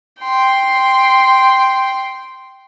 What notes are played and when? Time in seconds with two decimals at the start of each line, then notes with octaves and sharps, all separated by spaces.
0.22 G5 C6